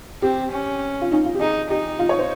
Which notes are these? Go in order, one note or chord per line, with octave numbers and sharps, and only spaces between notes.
C4 G4
C#4
F4
D#4
F4
G4
D#4 G#4
D#4 G4
F4
C#5
C5